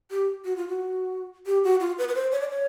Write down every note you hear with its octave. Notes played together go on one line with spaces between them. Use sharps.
G4
F#4
F4
F#4
G4
F#4
F4
B4
B4
C5
C#5
D5
C#5